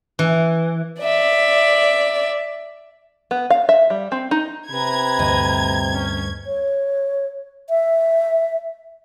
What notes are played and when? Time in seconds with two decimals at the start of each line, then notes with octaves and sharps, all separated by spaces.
0.19 E3
1.01 D5 E5
3.31 B3
3.50 F5
3.69 E5
3.90 G3
4.12 C4
4.31 D#4
4.71 C3 B4 A#5 G#6
5.19 D2 G2 D#5
5.94 C#4
6.47 C#5
7.70 E5